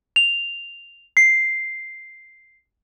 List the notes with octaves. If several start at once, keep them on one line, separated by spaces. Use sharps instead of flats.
F7
C7